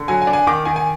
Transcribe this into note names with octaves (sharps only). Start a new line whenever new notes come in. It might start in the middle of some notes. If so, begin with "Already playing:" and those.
Already playing: D3
F#3 G#5
G#5
D4
G#5
D#3 D6
D#3 G#5
G#5